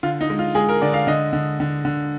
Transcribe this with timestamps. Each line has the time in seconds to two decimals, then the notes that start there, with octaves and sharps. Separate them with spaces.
0.03 D3 F4
0.21 D#4
0.30 G#3
0.39 F4
0.55 G#3 G#4
0.69 A#4
0.82 D3 D5
0.94 F5
1.07 D3 D#5
1.33 D3
1.60 D3
1.85 D3